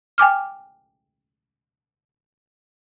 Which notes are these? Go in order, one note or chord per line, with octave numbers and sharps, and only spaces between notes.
G5 G#5 D6 F6